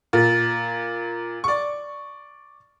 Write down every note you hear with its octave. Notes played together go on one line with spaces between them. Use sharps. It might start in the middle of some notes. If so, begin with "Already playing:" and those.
A#2
D5 C#6